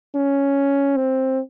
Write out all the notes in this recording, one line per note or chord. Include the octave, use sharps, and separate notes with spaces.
C#4
C4